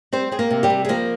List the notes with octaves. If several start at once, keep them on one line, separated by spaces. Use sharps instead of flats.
G3 C4 C5
C4 G#4
A#3 A#4
C3
G3 G4
C3
G#4
F3 A#3 A#4